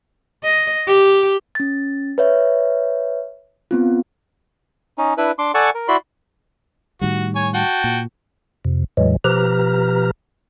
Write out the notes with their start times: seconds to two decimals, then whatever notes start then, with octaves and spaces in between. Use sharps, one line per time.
0.43 D#5
0.87 G4
1.55 C#4 A6
2.18 B4 C#5 E5
3.71 B3 C4 F4
4.98 C#4 D#4
5.18 D4 E4 B4
5.39 D4 C6 D6
5.54 A4 D5 F#5 G#5 A5 C#6
5.75 A#4
5.88 E4 F#4 D5 B5 C6
7.01 A2 D#3 G3 F#4
7.35 C#5 G#5
7.54 F#4 G5 A5
7.84 A#2
8.65 F2 C3
8.97 E2 A2 E3 F#3 G#3
9.24 B2 F3 G4 B4 A#5 F6